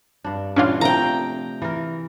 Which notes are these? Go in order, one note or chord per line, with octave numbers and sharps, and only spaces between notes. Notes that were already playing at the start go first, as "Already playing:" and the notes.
G2 D4
A#2 E3 C#4 D4 F4
C3 F3 A3 G5 A#5
E3 A#4